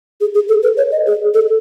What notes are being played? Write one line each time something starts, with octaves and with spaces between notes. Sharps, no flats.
G#4
G#4
A4
B4
C#5
D#5
G#4
A4